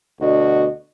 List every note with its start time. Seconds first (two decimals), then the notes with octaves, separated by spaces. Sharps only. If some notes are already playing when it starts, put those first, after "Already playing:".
0.21 D2 B2 D4 F#4 D#5